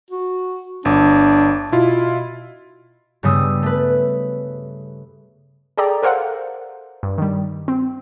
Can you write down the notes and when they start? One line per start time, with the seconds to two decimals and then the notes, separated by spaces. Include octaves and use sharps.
0.11 F#4
0.85 G1 D4
1.72 B2 E4 F4
3.23 G2 C#3 G3 B3 D#6 E6
3.63 A3 B4
5.78 G#4 A4 D5 G5 A#5
6.03 A4 A#4 C5 F5 F#5
7.03 G2
7.18 D#3 G3
7.68 C4